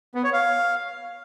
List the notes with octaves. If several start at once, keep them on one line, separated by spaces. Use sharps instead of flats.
B3
C#5
F5